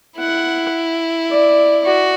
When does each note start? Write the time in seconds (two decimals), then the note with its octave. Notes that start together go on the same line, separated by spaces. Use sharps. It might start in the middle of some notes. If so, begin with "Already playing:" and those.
0.18 E4 F#5
1.30 D5
1.84 F#4 D5